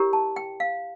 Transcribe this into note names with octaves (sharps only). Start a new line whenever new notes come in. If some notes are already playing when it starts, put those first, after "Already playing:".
Already playing: E4 G4 A#4 C#5
A5
G5
F5